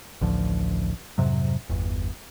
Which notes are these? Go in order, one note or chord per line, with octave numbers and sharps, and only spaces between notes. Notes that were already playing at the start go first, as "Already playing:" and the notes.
A1 D2 F3
F2 G#2 C3 F#3
G1 E2